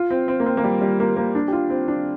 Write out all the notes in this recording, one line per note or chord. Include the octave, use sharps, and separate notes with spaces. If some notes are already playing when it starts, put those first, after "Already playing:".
Already playing: F4
C4
C4
A#3
C4
A#3
G3
G3
A#3
A#3
D4
G4
F4
C4
D4